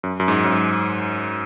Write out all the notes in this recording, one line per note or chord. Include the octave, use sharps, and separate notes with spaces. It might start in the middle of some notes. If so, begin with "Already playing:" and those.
F#2
F#2
G#2
F#2
G#2